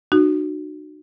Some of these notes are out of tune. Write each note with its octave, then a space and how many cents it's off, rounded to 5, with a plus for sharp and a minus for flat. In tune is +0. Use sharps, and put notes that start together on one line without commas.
D#4 -45 F#4 +0